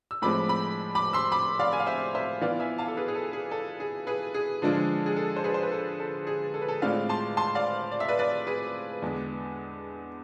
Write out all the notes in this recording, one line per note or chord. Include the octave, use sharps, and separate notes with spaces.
E6
A2 F3 G#3 C4 B5 D6
B5 D6
B5 D6
C6 E6
B5 D6
D5 F5
G#5
F5
C5 E5
C5 E5
E3 B3 F4 D5 F5
E5 G#5
F5 A5
A4
G#4 B4
G#4
A4
G#4
A4
G#4
G#4 B4
G#4
D3 F3 G#3 D4 F4
G#4
A4
C5
G#4 B4
C5
B4
A4
A4
G#4
A4
B4
A4
A2 G#3 C4 F4 D5 F5
A5 C6
A5 C6
D5 F5
D5
E5
B4 D5
B4 D5
G#4 B4
E2 D3 G#3 D4